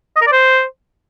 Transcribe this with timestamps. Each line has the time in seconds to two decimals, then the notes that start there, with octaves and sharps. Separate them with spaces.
0.16 D#5
0.22 A#4
0.27 D5
0.32 C5